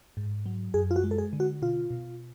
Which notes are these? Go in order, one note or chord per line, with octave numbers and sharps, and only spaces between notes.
G#2
F#3
F#2 G#4
F4
F#4
G#3
A4
G#4
D3
F#4
B2 F4
B2